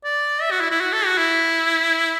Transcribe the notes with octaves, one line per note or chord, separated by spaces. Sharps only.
D5
E5
F#4
E4
E4
F#4
A4
F#4
E4